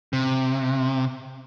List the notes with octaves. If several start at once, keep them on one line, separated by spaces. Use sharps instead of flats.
C3